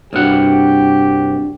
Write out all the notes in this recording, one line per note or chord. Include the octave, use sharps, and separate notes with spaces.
C2 G2 D4 F#4 G4 F#5